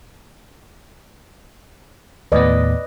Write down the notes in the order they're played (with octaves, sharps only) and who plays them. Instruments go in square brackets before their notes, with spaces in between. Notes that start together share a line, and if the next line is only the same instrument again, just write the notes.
[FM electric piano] D#2 A2 B3 [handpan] B4 D5 D#5